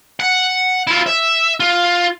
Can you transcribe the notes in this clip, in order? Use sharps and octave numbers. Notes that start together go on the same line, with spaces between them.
F#5
E4 F4
E5
F4